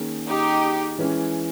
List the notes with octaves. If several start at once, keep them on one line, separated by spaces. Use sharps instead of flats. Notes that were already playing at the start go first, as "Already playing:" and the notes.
Already playing: D#3 A#3 C#4 G#4
D#4 G4
E3 G#3 C#4